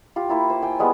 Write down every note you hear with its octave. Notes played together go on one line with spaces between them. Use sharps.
F4 G4
A#3 E4 F4
C5
G5 G#5
G3 G#3 B3